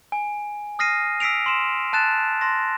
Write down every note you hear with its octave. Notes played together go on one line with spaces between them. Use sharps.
G#5
D#6 F6 A#6 C7 D#7
E6 B6 C7 D7 F7
C6 E7
A5 F#6 A6 E7
C6 A#6